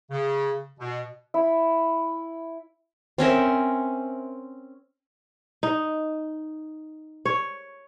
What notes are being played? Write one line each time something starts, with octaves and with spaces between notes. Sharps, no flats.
C#3
B2
E4
C4 C#4 A#4 E5
D#4
C#5